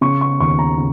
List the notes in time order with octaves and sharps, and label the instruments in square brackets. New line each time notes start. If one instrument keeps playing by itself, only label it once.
[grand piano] C#3 C#6
C#6
D#2 C#6
A#5
C#3